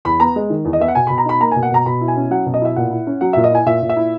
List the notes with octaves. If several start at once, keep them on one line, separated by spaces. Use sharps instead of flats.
E2 B5
B3 A#5
G#3
D#3
E2
D#5
B3 E5
F#5
B2 G#5
B2 B5
A#5
D#4 B5
A#3 A#5
B2 G#5
F#5
B2 A#5
B2 B5
E4
G#5
C#4
F#3 F#5
B2
D#5
E4 E5
A#2 F#5
E4
C#4
F#3 F#5
A#2 E5
D#5
E4 G#5
A#2 E5
A#2
E5
E4